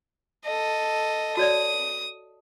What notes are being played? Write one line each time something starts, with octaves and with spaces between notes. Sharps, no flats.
A4 D#5
F#4 C#5 D5 D#6